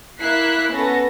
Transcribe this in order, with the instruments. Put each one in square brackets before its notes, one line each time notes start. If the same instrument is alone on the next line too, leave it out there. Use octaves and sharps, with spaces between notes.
[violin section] A#3 E4 F#6 B6 C7
B3 C#4 A4 B4 A#6